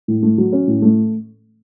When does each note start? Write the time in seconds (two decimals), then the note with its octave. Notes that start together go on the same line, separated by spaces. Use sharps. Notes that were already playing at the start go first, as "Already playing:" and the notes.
0.08 A2
0.23 A3
0.38 F#3
0.53 C#4
0.67 A2
0.82 A3